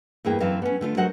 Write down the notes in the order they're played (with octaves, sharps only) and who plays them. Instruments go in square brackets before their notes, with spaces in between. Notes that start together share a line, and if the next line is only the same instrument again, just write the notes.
[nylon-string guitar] E2 G2 E3 A#3 G#4 G5
F#2 E3 C4 F5 A5
B3 C#4
D3 A3 F4
F#3 G#3 F#4 A#4 C5 F#5